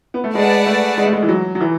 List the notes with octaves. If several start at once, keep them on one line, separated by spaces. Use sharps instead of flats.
B3
A3
G#3 G#4 B4 D5 F#5 A5
A3
G#3
A3
G#3
E3
F#3
F#3
E3